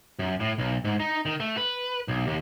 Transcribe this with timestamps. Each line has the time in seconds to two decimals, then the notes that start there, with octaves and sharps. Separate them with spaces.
0.19 F#2
0.40 A2
0.58 B1
0.85 G#2
1.00 D#4
1.26 D#3
1.40 A3
1.57 B4
2.08 B1
2.27 D#2